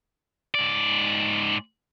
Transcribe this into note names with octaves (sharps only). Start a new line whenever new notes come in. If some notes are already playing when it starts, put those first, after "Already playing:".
G#2 D5